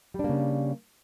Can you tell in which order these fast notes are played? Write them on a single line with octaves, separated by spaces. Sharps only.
G3 D4 A#3 C#3